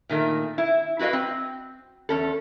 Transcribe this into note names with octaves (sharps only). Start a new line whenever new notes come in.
A#2 D#3 A3
E4
E4 F#4 B4 D#5 F5
C4
E2 C#4 A4